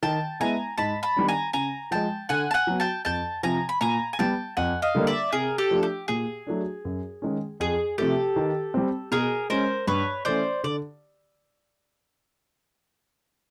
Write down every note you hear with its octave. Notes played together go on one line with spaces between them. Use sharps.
D#3 G5 A5
G#3 B3 E4 G#5 A#5
G#2 A5 B5
A5 B5
D#3 G3 B3 D4
G#5 A#5
C#3 G#5 A#5
F3 G#3 G5 A5
D3 F#5 G#5
A5
F#5 G#5
F#3 B3
G5 A5
F2 G5 A5
C3 F3 G#5 A#5
B5
A#2 G#5 A#5
G#5
G3 B3 G5 A5
F2 F#5 G#5
D#5 F5
D3 G3 A#3 D4
D5 E5
C3 G#4 A#4
G4 A4
F3 A3 D4 F4
G4
A#2 G#4
F#3 A3 D4
F#2
D#3 G#3 C#4
F2 G#4
C3 F3 A3 G4 A4
D#3
G3 C4
B2 G#4 A#4
G#3 C#4 A#4 C5
G2 B4 C#5
E3 A3 C#4 C5 D5
D3 D5